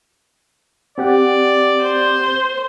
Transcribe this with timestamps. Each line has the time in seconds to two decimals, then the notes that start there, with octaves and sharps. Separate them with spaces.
0.98 C4 G4 D5 F#5
1.83 C5